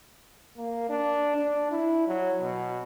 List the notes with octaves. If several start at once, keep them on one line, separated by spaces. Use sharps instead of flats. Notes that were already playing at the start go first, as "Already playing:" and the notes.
A#3
D4
D4
E4
F#3
B2